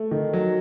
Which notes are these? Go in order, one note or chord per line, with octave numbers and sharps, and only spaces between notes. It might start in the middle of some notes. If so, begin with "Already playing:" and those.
Already playing: A3
D#3
F#3